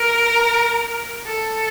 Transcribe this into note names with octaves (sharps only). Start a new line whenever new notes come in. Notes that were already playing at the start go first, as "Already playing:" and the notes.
Already playing: A#4
A4